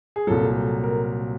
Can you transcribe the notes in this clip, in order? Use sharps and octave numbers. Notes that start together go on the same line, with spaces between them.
G#4
C2 A#2 F#3 A4
A#4